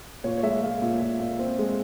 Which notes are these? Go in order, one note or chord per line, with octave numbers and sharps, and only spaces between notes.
A#2 C#5
C#5
G#3 E5
G#3 F5
A#2
A#2
A#2
C4
G#3